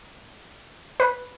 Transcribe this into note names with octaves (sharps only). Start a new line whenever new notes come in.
B4